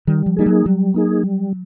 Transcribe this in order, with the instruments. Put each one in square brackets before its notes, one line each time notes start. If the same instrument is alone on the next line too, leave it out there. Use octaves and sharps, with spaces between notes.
[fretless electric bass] D#3 [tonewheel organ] G3
[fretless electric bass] F3
[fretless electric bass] G3 [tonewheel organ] A#3 D#4 G#4
[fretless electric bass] F#3
[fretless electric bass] F#3 [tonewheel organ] G3
[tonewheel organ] A#3 D#4 G#4
G3